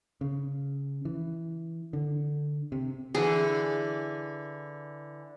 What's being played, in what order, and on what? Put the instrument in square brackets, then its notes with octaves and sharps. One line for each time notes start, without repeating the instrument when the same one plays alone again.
[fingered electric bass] C#3
E3
D3
C3
[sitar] D3 E3 [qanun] G#4